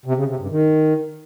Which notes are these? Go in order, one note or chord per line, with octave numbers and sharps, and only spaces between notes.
C3
C#3
C3
G2
D#3